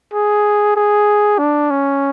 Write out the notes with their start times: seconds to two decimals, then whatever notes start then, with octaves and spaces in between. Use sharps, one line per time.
0.13 G#4
0.76 G#4
1.39 D4
1.70 C#4